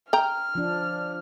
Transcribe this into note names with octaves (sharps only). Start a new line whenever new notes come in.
G5 A#5 F6
F3 D4